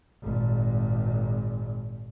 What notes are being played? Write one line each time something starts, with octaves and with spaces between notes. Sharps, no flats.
G#1 A#2